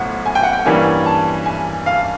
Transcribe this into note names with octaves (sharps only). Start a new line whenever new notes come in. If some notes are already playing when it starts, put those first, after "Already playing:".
Already playing: B1 A2 F3 F#5
G#5
G5
F#5
G5
G2 E3 G3 A#3 C#4 G#5
A5
G#5
F5